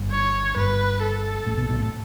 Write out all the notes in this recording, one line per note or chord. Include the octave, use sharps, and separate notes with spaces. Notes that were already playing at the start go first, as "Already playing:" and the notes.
Already playing: G1 G2
C#5
G1 G2 B4
A4
A1 A2
B1 B2
B1 B2
A2